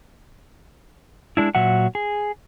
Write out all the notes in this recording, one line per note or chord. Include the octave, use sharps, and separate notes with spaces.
G#3 D4 E4
A#2 F#3 E5 F#5
G#4